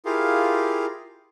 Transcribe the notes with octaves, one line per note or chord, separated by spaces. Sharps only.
E4 F4 G4 G#4 A#4 F5